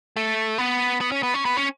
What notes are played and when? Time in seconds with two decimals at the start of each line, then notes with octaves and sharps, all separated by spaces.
0.16 A3
0.58 B3
1.01 B3
1.12 C#4
1.23 B3
1.34 C#4
1.45 B3
1.57 C#4